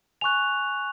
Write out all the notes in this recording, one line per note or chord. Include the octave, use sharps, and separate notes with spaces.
G#5 C#6 F#6 F7